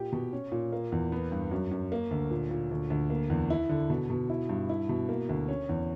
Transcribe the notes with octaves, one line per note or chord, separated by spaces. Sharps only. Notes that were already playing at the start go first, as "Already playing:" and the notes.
Already playing: A#2 G4
B2
C#4
A#2
A#3
E2
B3
G2
F#2
F#2
A#3
D2
A#2
A#2
D2
D2
A#3
E2
E4
D3
B2
B2
E4
G2
E4
B2
A#3
D2
C#4
E2